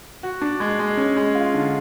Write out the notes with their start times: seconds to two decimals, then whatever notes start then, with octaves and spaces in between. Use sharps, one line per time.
0.23 F#4
0.42 D4
0.60 G#3
0.79 G#3
0.97 C#4
1.16 G#3
1.35 F4
1.54 D3